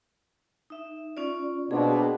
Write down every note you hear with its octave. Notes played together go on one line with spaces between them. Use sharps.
D#4 E5
C#4 F4 D5
B2 A#3 C4 D4 G#4